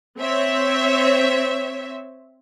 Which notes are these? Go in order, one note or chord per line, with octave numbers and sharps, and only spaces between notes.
C4 C#5 E5